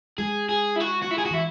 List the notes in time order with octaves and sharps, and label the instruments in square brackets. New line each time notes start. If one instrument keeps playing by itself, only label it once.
[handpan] G#3 [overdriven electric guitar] G#4
[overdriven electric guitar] G#4
E4
F#4
F#4
E4
G#4
F#4
[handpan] E3 [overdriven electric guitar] E4